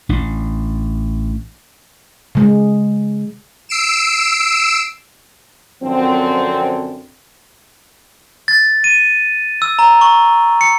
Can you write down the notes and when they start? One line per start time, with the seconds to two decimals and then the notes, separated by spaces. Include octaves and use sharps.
0.09 A1 D4
2.35 C#3 G#3
3.69 E6 C7 D7 E7
5.83 F#2 D3 F3 C4
8.48 A6
8.84 D#7
9.62 E6
9.79 A#5
10.01 C#6
10.61 C#7